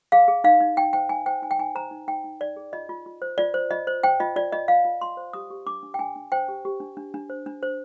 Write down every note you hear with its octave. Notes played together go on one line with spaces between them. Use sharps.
G#4 F5
G#4
D#4 F5
D#4
D#4 G5
C5 G5
D#4 G#5
C5 G5
D#4 G#5
G5
D#4 G#5
C5 A#5
D#4
D#4 G5
D#4
D#4 D5
G#4
F4 D#5
F4
F4
C5
F4 D5
C5
F4 D#5
C5
C5 G5
F4 D#5
F4 D5
F4 D#5
F4 F5
F4
F4 C6
C5
G4 D#6
G4
D4 D6
D4
G5
D4 G#5
D4
C5 G5
G4
G4
D4
D4
D4
C5
D4
C5